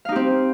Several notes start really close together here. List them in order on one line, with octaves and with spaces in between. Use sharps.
F5 D#4 G4 C4